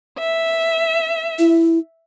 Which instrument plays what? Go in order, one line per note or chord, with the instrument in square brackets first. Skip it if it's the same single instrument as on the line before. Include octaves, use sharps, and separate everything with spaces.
[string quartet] E5
[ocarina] E4